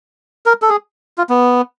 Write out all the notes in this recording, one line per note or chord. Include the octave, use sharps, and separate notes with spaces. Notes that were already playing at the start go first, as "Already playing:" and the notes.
A#4
A4
G#4
F4
B3